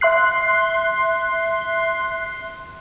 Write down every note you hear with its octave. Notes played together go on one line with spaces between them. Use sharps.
E5 C6 F#6 C7